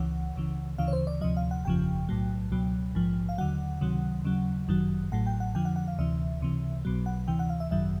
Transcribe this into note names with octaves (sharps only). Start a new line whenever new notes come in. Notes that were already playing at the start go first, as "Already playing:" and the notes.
Already playing: C#2 C#3 E3 F#5
C#2 C#3 E3
D2 C#3 E3 F5
C#5
C5
D5
D2 C3 F3 D#5
F5
F#5
G1 F2 C#3 F3 G5
B1 A2 F#3
C#2 B2 F#3
A#1 G#2 F3
F5
D#2 D3 F#3 F#5
C#2 C3 D#3 F#3
D#2 C#3 F#3
G1 F#2 D#3 F#3
A1 A2 F#3 F#5
G5
F#5
F2 D3 F3 G5
F#5
F#5
F5
D2 C3 E3 E5
C#2 C3 E3
B1 B2 F#3
F#5
D2 C3 E3 G5
F#5
F5
E5
G#1 F#2 D#3 F#3 E5